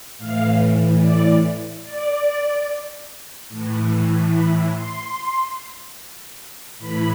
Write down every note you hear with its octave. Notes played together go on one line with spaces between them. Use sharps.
A2 E3 F5
D5
D5
A2 E3
B5
C6
A2 E3 B5